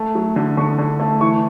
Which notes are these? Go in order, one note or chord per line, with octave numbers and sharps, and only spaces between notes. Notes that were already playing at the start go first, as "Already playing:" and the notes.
Already playing: A3
F#3
D3
D3 C#6
D3
A3
E3 C#6